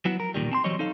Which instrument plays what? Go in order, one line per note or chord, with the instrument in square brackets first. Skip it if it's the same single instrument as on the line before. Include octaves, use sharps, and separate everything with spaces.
[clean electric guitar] F#3 B3 E4 F#5
A#4
B1 E2 A#2 D#3 G3
C4 A5 C6
E3 F#3 G3 C4 C#5 D#5
D#4 A4 F5